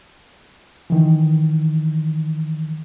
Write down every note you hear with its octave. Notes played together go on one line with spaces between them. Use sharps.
D#3 E3